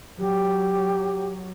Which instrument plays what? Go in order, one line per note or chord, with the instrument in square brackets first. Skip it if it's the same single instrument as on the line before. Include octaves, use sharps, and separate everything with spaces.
[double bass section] F#3 [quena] G4